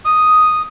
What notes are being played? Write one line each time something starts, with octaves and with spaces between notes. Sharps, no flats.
D#6